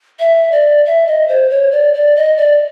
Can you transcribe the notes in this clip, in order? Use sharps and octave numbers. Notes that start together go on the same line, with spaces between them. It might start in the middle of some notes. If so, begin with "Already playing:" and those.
E5
D5
E5
D#5
C5
C#5
D5
D5
D#5
D5